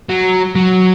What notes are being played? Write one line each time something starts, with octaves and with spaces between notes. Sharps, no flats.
F#3
F#3